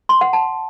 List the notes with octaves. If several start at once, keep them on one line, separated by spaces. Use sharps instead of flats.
C6
F#5
A5